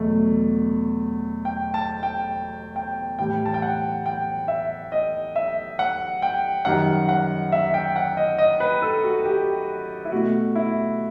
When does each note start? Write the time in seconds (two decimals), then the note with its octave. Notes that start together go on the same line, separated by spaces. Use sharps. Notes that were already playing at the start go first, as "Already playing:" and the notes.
Already playing: E2 B2 F#3 A3
1.45 G5
1.74 A5
2.03 G5
2.76 G5
3.19 A2 E3 G3 G5
3.46 A5
3.54 G5
3.62 F#5
4.06 G5
4.48 E5
4.92 D#5
5.36 E5
5.79 F#5
6.22 G5
6.65 F#2 D#3 G3 F#5
7.09 F#5
7.52 E5
7.74 G5
7.96 F#5
8.17 D#5
8.38 D#5
8.60 B4
8.82 A4
9.04 F#4
9.25 G4
10.05 E4
10.12 B2 A3 F#4
10.55 E4